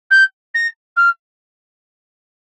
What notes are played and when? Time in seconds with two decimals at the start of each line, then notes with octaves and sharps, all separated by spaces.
0.10 G6
0.54 A#6
0.96 F6